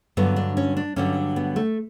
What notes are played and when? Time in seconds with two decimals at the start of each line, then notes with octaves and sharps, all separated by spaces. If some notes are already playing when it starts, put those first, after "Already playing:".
0.17 G2 D3 F#3 B3
0.36 D4
0.57 C#4
0.77 D4
0.96 G2 D3 F#3 C#4
1.36 B3
1.56 A3